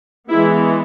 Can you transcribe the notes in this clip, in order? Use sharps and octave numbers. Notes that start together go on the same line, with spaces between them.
E3 G#3 B3 E4